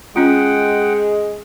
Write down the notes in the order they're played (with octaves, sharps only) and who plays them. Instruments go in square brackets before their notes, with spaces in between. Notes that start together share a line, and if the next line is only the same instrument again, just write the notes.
[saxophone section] G#3 [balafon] C#4 F4 [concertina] F#5 G5